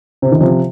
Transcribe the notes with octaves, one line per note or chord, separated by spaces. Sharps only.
C3
D#3
C3 F3